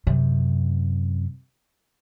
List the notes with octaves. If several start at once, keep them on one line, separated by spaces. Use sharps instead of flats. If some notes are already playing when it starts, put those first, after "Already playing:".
F#2 C3